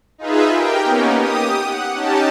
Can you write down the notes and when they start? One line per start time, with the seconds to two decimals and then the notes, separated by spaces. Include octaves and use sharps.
0.18 D#4 F4 G#4 B4 E5
0.53 G4 A#4 G5
0.83 A#3 B3 C#4 D#4
1.16 G4 D#6
1.65 F#5
1.94 C#4 D#4 G4 A5